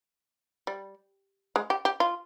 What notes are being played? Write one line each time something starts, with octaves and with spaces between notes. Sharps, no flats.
G3
G#3
G4
G4
F4